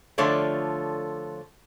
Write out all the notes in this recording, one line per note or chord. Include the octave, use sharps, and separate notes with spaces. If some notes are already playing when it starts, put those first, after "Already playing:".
D3 F3 A3 F4 C#5 D5